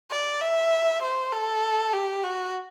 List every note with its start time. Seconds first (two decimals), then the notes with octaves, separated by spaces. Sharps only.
0.10 D5
0.41 E5
1.02 C5
1.33 A4
1.93 G4
2.24 F#4